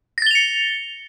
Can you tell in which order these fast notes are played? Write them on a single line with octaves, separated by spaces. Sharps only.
A#6 A6 G7 F7 C#7